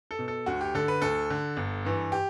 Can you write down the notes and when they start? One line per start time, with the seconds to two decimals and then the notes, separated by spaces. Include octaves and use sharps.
0.11 A4
0.19 B2
0.28 A4
0.46 D2 F#4
0.61 G4
0.74 D3 A4
0.88 B4
1.02 D2 A4
1.30 D3
1.57 G1
1.85 G2 E3
2.12 G4